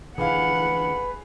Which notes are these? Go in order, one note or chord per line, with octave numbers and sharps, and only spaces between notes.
D3 E3 G#4 B4 F5 F#5